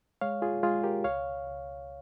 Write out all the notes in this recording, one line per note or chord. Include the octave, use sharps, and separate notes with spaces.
G#3 C#5 F5
F4 G#4
G#3 F4 G#4
G4 A#4
C#2 C#5 F5
C#2